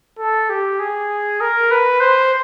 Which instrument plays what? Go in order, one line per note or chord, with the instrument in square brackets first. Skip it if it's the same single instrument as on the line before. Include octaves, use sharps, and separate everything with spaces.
[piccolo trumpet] A4
G4
G#4
A#4
B4
C5